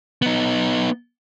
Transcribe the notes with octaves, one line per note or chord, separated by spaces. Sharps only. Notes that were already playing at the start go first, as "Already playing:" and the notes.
B3 D#4